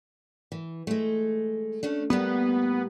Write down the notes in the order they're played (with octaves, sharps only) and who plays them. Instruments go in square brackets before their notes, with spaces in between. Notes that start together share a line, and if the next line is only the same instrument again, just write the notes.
[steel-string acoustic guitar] E3
G#3 A3
A3 C#4 D4
[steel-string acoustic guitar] A2 G3 A#3 [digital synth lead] B3